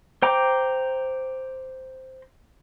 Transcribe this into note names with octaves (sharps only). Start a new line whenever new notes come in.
C5 G5 A#5 D6